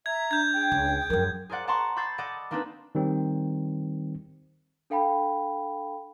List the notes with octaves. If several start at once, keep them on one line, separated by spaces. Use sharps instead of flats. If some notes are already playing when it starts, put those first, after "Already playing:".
E5 A#5 G#6
D4 G6 G#6
G#4 G5
C#2
F#2 F3 A#4
G#4 A#4 C5 D5 F#5
D5 F#5 A5 A#5 C6 C#6
B5 C#6 E6 G6 A6 C7
A4 D5 D#5 F#5
A#3 C4 D4 D#4 A4 B4
D#3 G3 C4
D4 A4 F5 G5 A5 B5